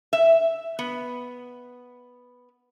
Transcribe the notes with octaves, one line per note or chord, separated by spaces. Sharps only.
E5
B3